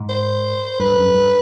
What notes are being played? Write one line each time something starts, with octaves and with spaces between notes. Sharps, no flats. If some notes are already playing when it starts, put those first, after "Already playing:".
Already playing: G#2
C5
G2 B4
F#2
G2